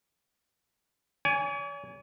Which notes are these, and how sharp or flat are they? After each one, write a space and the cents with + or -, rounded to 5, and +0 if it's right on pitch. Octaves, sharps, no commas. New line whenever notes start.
C#5 +45 G#5 -5